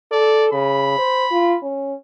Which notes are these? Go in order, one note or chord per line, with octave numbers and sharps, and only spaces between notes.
A4 D5
C#3 B5
C5
F4
C#4